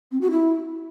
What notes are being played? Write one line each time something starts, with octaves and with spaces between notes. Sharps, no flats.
C4
F#4
E4